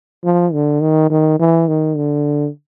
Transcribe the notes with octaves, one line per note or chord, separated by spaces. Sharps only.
F3
D3
D#3
D#3
E3
D#3
D3